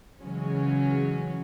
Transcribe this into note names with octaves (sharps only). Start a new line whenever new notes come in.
C#3 E3 F#3 G#3 C#4